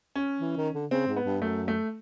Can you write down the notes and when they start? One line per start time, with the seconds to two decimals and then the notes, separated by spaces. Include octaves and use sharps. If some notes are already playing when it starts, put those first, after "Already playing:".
0.15 C#4
0.40 E3
0.57 D#3
0.74 D3
0.91 C#3 C4
1.08 G#2
1.16 B3
1.25 G2
1.42 F#2 A3
1.68 A3